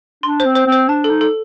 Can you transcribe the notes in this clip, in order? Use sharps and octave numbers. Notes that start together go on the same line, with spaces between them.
D4 C6
C5
C4
C5
C4
C5
D4 A5
A4
D#4
A4